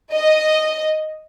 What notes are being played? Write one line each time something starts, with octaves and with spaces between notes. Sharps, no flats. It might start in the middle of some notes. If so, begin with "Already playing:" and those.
D#5